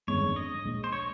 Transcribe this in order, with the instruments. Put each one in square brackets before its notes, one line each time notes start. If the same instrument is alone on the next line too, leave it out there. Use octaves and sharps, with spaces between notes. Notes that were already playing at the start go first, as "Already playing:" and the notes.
[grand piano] G1 F2 D#3 G#3 [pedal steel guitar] C#5
[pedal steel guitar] D#5
[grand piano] A#1 A#2 G#3
[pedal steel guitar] C5
C#5